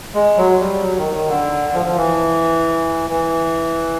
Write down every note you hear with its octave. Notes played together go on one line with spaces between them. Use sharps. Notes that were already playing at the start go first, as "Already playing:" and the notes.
G#3
F#3
G3
F#3
D#3
D#3
D3
F3
F3
E3
E3